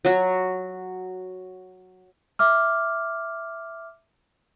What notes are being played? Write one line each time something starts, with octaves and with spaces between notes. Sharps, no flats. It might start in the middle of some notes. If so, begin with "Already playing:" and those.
F#3 F#4
E5 D6 F6